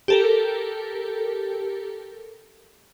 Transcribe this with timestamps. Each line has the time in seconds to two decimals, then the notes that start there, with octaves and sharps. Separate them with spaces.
0.08 G4 A4 A#4